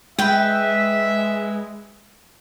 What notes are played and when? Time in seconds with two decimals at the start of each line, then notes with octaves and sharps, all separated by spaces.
0.19 G#3 B4 E5 G5